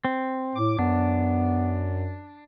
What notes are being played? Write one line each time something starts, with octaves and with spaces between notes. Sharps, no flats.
C4
A2 D6
F#2 B3 D4